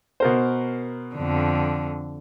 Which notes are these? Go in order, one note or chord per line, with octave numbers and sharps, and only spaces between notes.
B2 A#4 C5
F2 D3